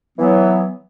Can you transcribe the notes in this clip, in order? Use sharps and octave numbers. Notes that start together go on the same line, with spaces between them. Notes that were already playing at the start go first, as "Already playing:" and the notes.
E3 F#3 B3